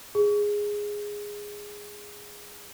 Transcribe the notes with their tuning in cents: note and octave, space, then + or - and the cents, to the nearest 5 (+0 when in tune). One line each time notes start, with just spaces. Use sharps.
G#4 -5